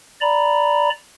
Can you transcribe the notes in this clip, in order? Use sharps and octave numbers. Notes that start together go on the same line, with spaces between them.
D5 A#5 B5